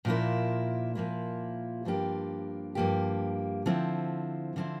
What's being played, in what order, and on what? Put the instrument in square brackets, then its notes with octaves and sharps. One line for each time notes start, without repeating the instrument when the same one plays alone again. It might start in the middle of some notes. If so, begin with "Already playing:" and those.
[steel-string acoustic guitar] A#2 F3 A#3 E4
A#2 F3 A#3 E4
G2 F3 A#3 D4 G4
G2 F3 A#3 D4 G4
D3 F3 C4 E4
D3 F3 C4 E4